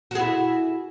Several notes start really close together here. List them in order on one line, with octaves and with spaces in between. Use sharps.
F#4 G#4 E4